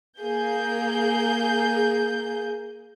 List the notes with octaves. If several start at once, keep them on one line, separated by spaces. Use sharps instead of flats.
A#3 G#4 G6